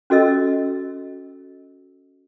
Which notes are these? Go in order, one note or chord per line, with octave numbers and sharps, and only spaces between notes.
C#4 F#4 A4 D#5 E6